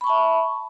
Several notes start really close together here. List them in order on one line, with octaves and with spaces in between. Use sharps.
B5 C#6 A5 E5